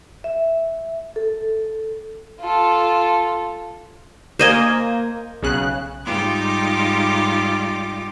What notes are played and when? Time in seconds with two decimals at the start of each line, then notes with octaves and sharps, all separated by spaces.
0.24 E5
1.16 A4
2.41 F4 A4
4.39 A#3 C5 D#5 G#5
5.43 B1 C#3 F#6
6.04 G#2 G3 D#4 F4 G4 D6